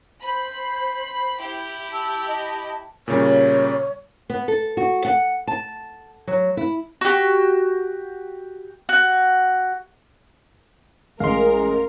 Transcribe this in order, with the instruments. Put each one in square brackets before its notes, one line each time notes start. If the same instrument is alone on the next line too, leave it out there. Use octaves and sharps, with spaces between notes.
[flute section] C5 [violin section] B5
[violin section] E4 G4
[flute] A5 [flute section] E6
[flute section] D#5
[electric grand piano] A#2 C#3 G3 [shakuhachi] C#5
[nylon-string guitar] B3
A4
F#4
F#5
A5
F#3
E4
[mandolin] F#4 G4
F#4
[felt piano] A1 A2 D#5 [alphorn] G#3 [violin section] A#4 [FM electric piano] F5 C6